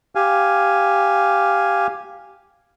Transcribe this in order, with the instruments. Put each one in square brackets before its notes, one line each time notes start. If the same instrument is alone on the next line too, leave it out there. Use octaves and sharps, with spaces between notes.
[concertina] G4 F5 G#5